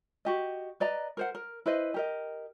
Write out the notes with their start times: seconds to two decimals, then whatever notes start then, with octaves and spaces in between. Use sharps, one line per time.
0.25 F#4 G4 D#5
0.80 B4 D5 D#5 A#5
1.17 A#4 C5 F#5
1.35 A#4
1.66 E4 B4 C5 D#5
1.94 G4 A#4 D#5